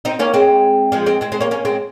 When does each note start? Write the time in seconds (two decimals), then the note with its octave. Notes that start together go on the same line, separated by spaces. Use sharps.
0.05 C4 D#4
0.19 A#3 C#4
0.34 G#3 C4
0.92 F3 G#3
1.06 G#3 C4
1.21 G#3 C4
1.32 G#3 C4
1.40 A#3 C#4
1.51 A#3 C#4
1.65 G#3 C4